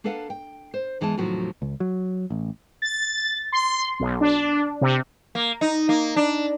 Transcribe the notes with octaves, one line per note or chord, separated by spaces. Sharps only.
A#3 D4 A4 B4 F5 F#5
G5
C5
E2 E3 G#3 E4 A5
D#2 A2 C3 F3 F#3 F#4
C#2
F#3
A1
A6
C6
B1
D4
C3
A#3
D#4
A#3
D4